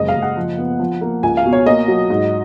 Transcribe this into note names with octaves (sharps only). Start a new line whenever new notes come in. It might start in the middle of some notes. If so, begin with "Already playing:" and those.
Already playing: F#1 G#3 D#5
F5
F#1
F#5
F3
B3
F3
A#3
C#2 G#5
F5
B2
C#5
A#3 D#5
F#3
G#2